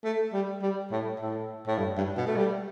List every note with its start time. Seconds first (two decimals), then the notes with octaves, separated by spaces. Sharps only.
0.04 A3
0.33 G3
0.62 G3
0.91 A2
1.20 A2
1.67 A2
1.78 G2
1.97 G2
2.17 B2
2.27 A3
2.37 G3